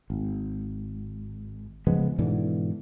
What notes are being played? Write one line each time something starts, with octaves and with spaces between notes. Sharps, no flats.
G#1
C#3 F3 G#3 B3
G#2 B2 D3 E3